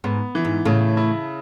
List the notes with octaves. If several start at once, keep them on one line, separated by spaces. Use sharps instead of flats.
G#2 B3
E3
G#2
A2 C#3
E4